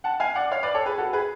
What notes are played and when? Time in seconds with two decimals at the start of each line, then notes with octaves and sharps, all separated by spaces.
0.04 F#5 A5
0.20 F5 G#5
0.35 D5 F#5
0.51 C#5 F5
0.63 B4 D5
0.74 A4 C#5
0.86 G#4 B4
0.98 F#4 A4
1.13 G#4 B4